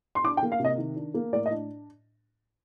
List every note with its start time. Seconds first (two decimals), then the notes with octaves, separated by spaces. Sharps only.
0.15 C6
0.24 D4 D6
0.37 G5
0.43 A#3
0.52 F5
0.60 C3 D#5
0.78 D#3
0.96 D4
1.14 A#3
1.33 A2 D5
1.46 D#5
1.51 D4